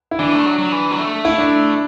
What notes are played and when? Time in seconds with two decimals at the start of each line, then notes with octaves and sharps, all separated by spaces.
0.11 E4
0.19 E3 D4
0.33 A3
0.46 F#3
0.59 F#3
0.72 E3
0.91 F#3
0.98 A3
1.25 E4
1.38 D4